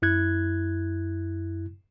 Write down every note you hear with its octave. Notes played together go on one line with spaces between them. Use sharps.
F#2 E4 F#6 G#6